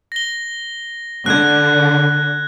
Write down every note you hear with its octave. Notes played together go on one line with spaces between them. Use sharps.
A#6 G7
D3 F#6 G#6